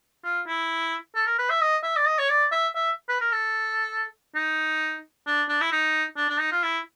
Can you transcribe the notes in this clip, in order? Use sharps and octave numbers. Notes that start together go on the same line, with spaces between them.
F4
E4
A4
A#4
B4
E5
D#5
E5
D5
D#5
C#5
D5
E5
E5
B4
A#4
A4
D#4
D4
D4
E4
D#4
D4
D4
D#4
F4
E4